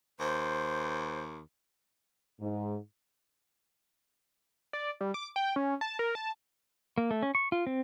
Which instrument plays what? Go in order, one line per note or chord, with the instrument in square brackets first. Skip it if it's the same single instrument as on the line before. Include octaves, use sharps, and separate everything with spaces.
[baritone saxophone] D#2 [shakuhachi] C5
[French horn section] G#2
[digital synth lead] D5
G3
D6
G5
C#4
A5
A#4
A5
[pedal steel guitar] A#3
A3
C#4
C#6
F4
C4